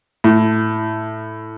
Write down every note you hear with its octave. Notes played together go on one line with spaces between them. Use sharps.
A2